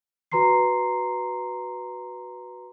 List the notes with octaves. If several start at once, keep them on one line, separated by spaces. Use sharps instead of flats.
F#4 B4 A#5 C6 C7